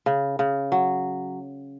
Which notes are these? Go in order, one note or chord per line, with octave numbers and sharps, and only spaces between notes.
C#3
C#3
F#3